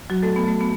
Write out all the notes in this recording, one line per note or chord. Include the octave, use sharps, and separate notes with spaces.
F#3 F#4
A3 A4
B3
A3
B3